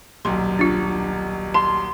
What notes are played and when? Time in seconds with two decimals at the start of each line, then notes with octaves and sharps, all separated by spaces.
0.25 D#1 B1 C6
0.59 D4 F4
1.54 A5 C6